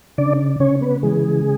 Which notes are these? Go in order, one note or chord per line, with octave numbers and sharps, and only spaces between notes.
C#3 D4 D5
C#3 C#4 C#5
B3 B4
E3 G#3 G#4